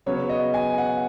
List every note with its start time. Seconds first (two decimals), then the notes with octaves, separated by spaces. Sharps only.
0.06 C#3 F#3 B3 C#5
0.29 D#5
0.54 G#5
0.78 F#5